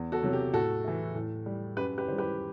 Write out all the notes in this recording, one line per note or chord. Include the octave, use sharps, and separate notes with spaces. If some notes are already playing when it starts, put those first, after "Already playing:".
Already playing: E2
F#4 A4
C3 F#3
G4
A2 F#4 A4
E3 A3
A2
G3
F#2 G4 B4
G4 B4
D#3 G3 C5
G4 B4